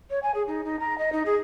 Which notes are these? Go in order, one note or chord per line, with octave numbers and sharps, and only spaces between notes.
C#5
G#5
G#4
D#4
D#4
A#5
D#5
D#4
G#4